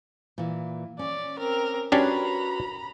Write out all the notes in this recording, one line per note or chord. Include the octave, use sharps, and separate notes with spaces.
A#2 E3
C#4 D5
C4 A#4
C#4 D4 F#4 G4 A#4 B4 A#5 B5